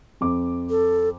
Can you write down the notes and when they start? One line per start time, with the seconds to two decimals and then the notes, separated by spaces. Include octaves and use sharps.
0.21 F2 D6
0.70 A4